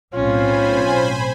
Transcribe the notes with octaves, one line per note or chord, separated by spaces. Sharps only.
B1 A2 C4 C#4 F4 C5 G#5 B5